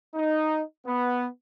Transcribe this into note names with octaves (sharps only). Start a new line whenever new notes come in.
D#4
B3